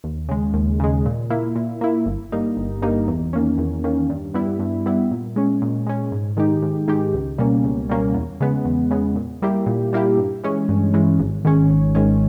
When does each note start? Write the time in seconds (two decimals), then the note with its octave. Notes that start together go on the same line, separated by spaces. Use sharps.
0.04 D#2
0.29 C#3 G#3
0.54 D#2
0.80 C#3 G#3
1.06 A#2
1.30 A#3 E4
1.56 A#2
1.81 A#3 E4
2.06 G1
2.32 G2 G3 A#3 D#4
2.57 G1
2.82 G2 G3 A#3 D#4
3.08 E2
3.33 D#3 A#3 C#4
3.58 E2
3.84 D#3 A#3 C#4
4.10 G2
4.34 G3 B3 E4
4.59 G2
4.86 G3 B3 E4
5.11 A#2
5.36 G#3 C#4
5.62 A#2
5.87 G#3 C#4
6.12 G#2
6.37 D#3 G#3 D#4 G4
6.62 G#2
6.88 D#3 G#3 D#4 G4
7.14 C#2
7.38 B2 G3 A#3 C#4
7.64 C#2
7.90 B2 G3 A#3 C#4
8.14 E2
8.40 C#3 G#3 B3
8.65 E2
8.91 C#3 G#3 B3
9.16 A#2
9.42 G3 A#3 E4 G4
9.66 A#2
9.93 G3 A#3 E4 G4
10.17 G2
10.44 E3 G#3 C#4
10.69 G2
10.94 E3 G#3 C#4
11.20 G#1
11.45 G#2 D#3 G#3 C#4
11.70 G#1
11.95 G#2 D#3 G#3 C#4